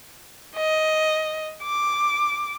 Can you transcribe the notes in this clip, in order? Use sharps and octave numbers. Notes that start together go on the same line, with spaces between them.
D#5
D6